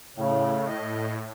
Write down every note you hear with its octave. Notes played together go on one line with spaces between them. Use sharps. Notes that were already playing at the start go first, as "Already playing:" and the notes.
A2 C#3
D#5